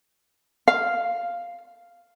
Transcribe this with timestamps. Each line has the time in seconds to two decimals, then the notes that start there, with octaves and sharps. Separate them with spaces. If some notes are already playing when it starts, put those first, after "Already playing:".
0.68 F5